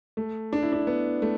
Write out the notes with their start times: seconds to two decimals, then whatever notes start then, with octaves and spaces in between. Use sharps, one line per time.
0.17 A3
0.53 D4
0.62 E4
0.72 D4
0.87 B3
1.22 A3